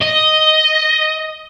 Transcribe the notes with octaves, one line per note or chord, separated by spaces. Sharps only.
D#5